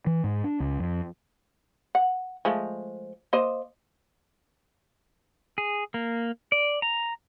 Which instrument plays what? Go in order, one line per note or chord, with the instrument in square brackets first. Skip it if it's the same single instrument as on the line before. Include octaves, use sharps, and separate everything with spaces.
[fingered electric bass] E3
G#2
D4
C#2
F2
[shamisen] F#5
F3 G#3 A3
A#3 C5 D#5
[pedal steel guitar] G#4
A#3
D5
A#5